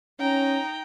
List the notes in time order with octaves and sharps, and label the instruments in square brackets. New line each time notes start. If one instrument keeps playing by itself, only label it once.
[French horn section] C#4 [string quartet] D#4 G5 A#5